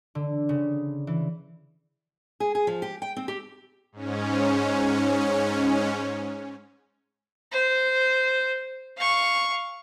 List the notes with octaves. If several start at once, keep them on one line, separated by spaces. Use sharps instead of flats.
D3
C#3
E3
G#4
G#4
F3
G4
G5
C4
G4
G#2 C#4
C5
F5 C#6